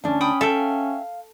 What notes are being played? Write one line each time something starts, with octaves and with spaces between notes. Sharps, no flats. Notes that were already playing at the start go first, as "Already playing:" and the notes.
D2 C#4 D4
G5 B5 D#6
A4 E5 F5 G5